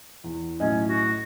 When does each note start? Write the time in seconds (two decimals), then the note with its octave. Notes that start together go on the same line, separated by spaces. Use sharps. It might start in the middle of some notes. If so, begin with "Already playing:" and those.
0.24 E2
0.60 B1 A2 C#4 D#5
0.88 F#4